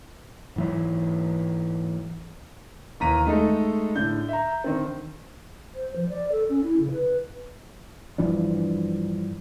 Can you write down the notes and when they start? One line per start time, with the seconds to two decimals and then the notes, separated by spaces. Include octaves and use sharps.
0.56 G#2 E3 F#3
3.00 D#2 E3 A#5 B6 D#7
3.26 G#3 A3 D#4 A4
3.95 A2 D3 G6
4.29 E5 A#5
4.64 D3 D#3 C4
5.75 C5
5.96 F3
6.09 D5
6.32 A4
6.49 C#4
6.63 E4
6.80 C#3
6.91 B4
8.18 G2 E3 F3 D4